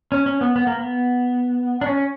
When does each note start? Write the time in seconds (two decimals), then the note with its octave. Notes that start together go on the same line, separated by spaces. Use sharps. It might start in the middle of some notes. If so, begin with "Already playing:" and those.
0.12 C#4
0.26 C#4
0.41 B3
0.56 B3
0.67 A#3
0.79 B3
1.81 D4
1.86 C#4